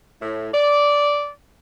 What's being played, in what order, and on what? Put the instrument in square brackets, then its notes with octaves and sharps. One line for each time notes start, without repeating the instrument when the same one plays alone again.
[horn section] A2
D5